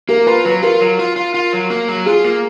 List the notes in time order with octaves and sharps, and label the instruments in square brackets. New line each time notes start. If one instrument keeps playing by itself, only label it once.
[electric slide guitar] A#3 [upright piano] A#4
[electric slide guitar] F4 [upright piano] B4
[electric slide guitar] F#3 [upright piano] B4
[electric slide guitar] F4 [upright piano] A#4
[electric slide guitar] F#3
F4
F4
F4
F#3
A#3
F#3
[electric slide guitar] F4 [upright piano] G#4
[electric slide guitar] A#3